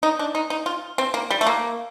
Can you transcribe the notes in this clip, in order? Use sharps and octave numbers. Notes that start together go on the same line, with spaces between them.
D#4
D4
D#4
D#4
F4
C4
A#3
G3
A3
A#3